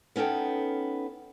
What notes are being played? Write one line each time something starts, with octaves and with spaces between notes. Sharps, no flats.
B3 C#4 D#4 A4 G5